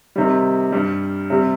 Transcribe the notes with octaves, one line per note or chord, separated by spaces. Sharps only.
C3 D#3 G3
G2 G3
C3 G3